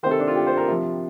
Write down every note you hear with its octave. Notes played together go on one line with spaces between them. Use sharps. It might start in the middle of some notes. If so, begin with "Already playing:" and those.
C3 D#3 A4 C5
D4
F4
G4
C5
A#4
C3 F3